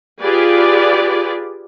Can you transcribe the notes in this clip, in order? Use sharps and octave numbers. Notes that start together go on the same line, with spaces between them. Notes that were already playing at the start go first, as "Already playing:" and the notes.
F4 G4 G#4 B4 D5